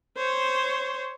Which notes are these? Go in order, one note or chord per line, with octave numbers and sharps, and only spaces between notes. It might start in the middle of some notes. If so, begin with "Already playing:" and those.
C5 C#5